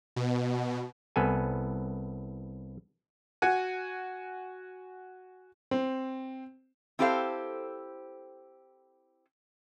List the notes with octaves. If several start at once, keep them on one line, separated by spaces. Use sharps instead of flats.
B2
C2 B3 A4 G#5
F#4 F#5 G#5
C4
C4 E4 G4 A4 C5 F5